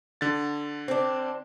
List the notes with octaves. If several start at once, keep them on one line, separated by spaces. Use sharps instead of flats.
D3 A6
C4 D4